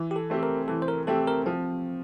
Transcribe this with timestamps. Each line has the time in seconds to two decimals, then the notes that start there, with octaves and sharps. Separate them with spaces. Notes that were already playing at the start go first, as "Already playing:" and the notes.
Already playing: E3
0.11 G4
0.16 A4
0.30 A3 C4 G4
0.43 A#4
0.68 E3 A4
0.82 C5
0.88 A#4
1.07 A3 C4 G4 A4
1.27 A#4
1.46 F3 C4